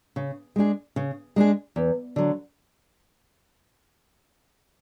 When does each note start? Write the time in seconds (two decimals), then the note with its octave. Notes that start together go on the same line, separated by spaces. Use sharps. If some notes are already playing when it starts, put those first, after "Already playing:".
0.16 C#3
0.56 G#3 D4 G#4
0.96 C#3
1.36 G#3 D4 G#4
1.76 E2
2.16 D3 F#3